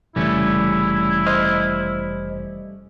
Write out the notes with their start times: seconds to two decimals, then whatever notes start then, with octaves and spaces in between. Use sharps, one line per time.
0.16 F1 C#3 E3 G3 A3 C#4 E4
1.26 C5 D#5 F6